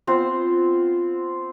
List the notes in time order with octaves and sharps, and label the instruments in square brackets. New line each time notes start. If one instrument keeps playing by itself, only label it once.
[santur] B3 C4 F4 C5